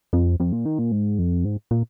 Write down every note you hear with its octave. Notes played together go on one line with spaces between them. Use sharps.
F2
F2
A#2
D#3
A#2
G#2
F2
G#2
A#2